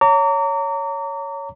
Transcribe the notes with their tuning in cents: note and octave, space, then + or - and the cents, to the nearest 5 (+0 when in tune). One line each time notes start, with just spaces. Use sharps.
C#5 +10 A#5 -30 D6 -40